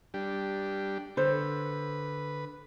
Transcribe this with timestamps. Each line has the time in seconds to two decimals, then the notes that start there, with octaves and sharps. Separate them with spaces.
0.14 G3 D4 G4
1.17 D3 B4 C5